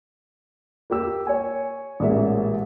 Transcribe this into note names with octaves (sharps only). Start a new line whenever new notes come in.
A#3 G4 E6
C#5 G#5
A1 A#2 G#3 A#3 E5